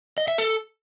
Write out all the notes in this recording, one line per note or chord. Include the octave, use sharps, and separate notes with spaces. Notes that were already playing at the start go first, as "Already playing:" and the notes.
D#5
E5
A4